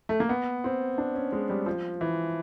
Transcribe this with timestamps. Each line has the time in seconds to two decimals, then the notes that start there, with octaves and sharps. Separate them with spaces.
0.09 A3
0.20 A#3
0.29 B3
0.64 C4
0.98 D4
1.15 C#4
1.32 G#3
1.50 G3
1.66 F3
2.01 E3